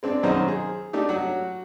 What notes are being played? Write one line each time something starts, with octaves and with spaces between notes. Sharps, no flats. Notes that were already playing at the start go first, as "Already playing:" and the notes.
G#3 C4 D4
B1 F#2 D#3 D#4 C5 D#5
G#4
A3 D4 D#4 G4
F#3 F#4